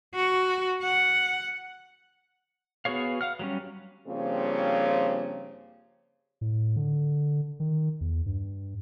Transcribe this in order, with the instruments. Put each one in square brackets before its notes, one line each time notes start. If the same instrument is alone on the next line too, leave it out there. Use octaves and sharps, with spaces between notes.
[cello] F#4
F#5
[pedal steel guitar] B3 F#4 G#4 C#5 F5
F5 F#5 F6
F#3 G3 C#4
[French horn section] G2 C#3 F3 A#3 C4 C#5
[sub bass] A2
D3
D#3
E2
G2